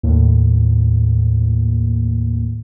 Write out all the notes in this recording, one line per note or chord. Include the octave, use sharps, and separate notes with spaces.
D#2 A2